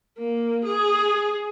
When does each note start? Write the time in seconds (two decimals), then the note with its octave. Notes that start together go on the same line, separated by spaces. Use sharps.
0.18 A#3
0.65 G#4